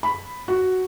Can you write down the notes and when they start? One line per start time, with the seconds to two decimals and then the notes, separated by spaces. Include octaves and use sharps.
0.03 B5
0.48 F#4